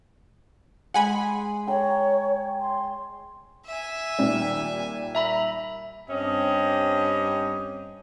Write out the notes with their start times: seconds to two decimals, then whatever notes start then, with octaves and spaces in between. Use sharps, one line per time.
0.94 G#3 F#5 G#5 B5
1.67 C#5 G5 A#5
2.60 C6
3.67 E5 G#5
4.18 A#2 D#3 G3
5.15 E5 A#5 B5
6.09 G2 C4 C#4 G4 D#5